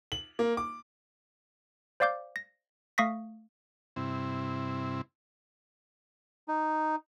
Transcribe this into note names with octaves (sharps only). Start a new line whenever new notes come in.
F#7
A#3
D6
C5 D5 F5 D6 G6
A#6
A3 F5 C#6 D#6 A#6 B6
G2 C3 C4 E4
D#4